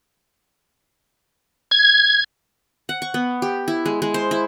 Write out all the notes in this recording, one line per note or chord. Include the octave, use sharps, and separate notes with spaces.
G#6
F#5
C#6
B3
G4
E4
G#3
G#3
C5
E4